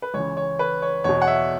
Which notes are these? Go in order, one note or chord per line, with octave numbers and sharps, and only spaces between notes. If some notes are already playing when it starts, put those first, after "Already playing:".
B4
C#2 C#3 E3 C#5
C#5
B4
C#5
E2 B2 C#5
F#5
E5